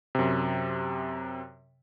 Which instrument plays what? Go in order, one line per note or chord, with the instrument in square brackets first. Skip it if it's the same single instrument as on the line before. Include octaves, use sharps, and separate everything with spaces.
[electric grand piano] F#2 C3